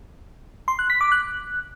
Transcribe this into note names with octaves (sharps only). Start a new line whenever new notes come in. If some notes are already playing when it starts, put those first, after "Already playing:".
C6
F#6
B6
D6
F#6